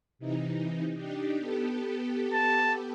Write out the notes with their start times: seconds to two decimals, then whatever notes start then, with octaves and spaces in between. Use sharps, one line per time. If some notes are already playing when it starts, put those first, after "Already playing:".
0.19 C3 E3 D#4
0.94 D4 D#4 G4
1.38 B3 G4 A4
2.33 A5